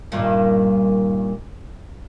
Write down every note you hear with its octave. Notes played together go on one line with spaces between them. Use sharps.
G2 A#2 D#3